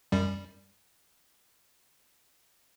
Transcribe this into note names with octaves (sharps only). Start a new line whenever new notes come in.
F#2 G3